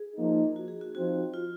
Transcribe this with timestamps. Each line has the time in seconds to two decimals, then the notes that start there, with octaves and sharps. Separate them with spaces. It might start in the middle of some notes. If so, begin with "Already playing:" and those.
Already playing: G#4
0.16 F3 A#3 D#4
0.56 F#4
0.68 G#4
0.81 F#4
0.95 F3 C4 D#4 F#4
1.34 F4